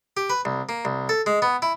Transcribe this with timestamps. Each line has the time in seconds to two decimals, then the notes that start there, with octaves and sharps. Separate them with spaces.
0.17 G4
0.30 B4
0.45 C2
0.69 A#3
0.85 C2
1.09 A4
1.26 G#3
1.42 B3
1.62 E4